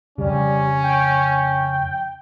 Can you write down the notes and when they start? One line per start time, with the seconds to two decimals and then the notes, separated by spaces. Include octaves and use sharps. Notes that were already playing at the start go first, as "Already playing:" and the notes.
0.18 F2 C#3 G3 C#4
0.83 G5